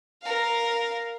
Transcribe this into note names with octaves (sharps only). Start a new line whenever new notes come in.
A#4 F5